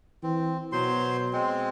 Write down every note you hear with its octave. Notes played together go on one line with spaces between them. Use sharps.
E3 C4
B2 F#3 C5 C6
G#3 C4